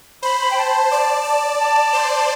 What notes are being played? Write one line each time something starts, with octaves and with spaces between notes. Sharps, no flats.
C5 B5
B5
G5
A5
D5
D5
A5
C5